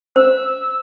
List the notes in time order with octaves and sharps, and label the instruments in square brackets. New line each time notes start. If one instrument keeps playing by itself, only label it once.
[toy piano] C5 [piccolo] E6